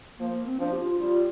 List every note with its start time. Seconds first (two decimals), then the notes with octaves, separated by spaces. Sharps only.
0.19 F3 A#3
0.33 A#3
0.46 C4
0.59 F3 D4
0.72 G4
0.80 F4
1.00 G3 F4